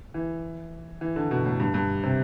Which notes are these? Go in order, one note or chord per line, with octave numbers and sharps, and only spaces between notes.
E3
E3
D3
B2
A2
G2
G2
C3